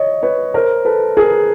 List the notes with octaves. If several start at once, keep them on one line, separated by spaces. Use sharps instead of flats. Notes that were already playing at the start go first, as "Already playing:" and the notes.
Already playing: C#5 D#5
B4 C#5
A#4 C5
A4 B4
G#4 A#4